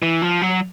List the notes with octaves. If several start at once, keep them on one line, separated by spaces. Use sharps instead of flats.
E3
F3
F#3